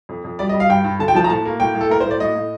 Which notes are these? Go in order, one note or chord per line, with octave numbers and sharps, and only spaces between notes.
F2
F2
G3 D5
D#5
G3
F5
G2 G5
G2
D3 A5
G5
F3 A5
A#5
A2 A5
A#3
A2 G5
A2
A4
A2 A#4
A2 C5
D5
A2 D#5
A2